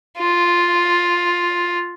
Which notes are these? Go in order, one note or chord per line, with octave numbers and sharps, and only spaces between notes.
F4